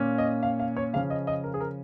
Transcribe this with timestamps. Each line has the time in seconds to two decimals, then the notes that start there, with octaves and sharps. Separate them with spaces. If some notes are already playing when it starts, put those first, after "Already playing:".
Already playing: A#2 A#3 C#4
0.18 D#5
0.43 F5
0.59 F5
0.77 C#5
0.93 C#3 F3 C#4 F5
1.10 D#5
1.27 D#5
1.44 A#4
1.54 G#4
1.61 A#4